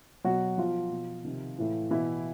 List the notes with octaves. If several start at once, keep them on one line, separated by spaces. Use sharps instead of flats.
B2 F#3 F#4
B2 F3 F4
B2
C3 D#3
A2 E3
B2 E3 E4